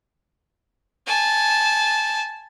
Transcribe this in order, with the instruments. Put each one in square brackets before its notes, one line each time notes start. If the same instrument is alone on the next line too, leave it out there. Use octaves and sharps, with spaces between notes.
[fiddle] G#5 A5